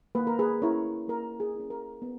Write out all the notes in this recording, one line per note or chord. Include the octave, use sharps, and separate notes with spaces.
A#3 B4
A#4
G#4 B4
C#4 E4 A#4 C#5
A#3 A#4
G#4
C#4 E4
A#4
B3